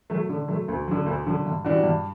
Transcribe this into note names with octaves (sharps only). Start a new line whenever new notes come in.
F#3 A3
D3
F#3 A3
D2
D3 F#3
D2
D3 F#3
G2
E3 G3 D4 F#4
G2